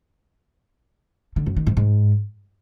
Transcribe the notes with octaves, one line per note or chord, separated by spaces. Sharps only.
D3
F#2
D#3
G#2
G#2